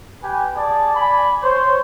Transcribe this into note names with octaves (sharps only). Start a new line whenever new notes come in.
G4 B4 G#5
G#4 D5 G#5 A5
D5 G#5 B5
C5 C#5